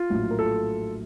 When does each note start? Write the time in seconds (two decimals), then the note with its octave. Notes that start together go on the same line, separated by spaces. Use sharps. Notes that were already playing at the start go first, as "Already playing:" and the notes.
Already playing: F4
0.10 A#1 A2 F#3
0.31 A#4
0.39 F4 A4